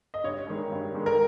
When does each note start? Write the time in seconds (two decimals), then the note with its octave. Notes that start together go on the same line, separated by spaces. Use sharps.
0.14 D#5
0.24 G2 C#5
0.47 D#3 G#3
0.72 G2
0.95 D#3 G#3
1.06 A#4